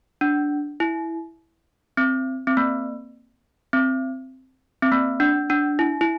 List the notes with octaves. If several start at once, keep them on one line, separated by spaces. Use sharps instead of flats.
D4
E4
C4
C4
A#3
C4
C4
A#3
D4
D4
E4
E4